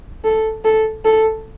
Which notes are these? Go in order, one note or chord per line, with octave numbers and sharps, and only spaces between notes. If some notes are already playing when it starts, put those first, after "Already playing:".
A4
A4
A4